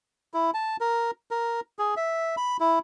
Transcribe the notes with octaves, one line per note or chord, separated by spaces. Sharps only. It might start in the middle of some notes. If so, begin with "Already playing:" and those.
E4
A5
A#4
A#4
G#4
E5
B5
E4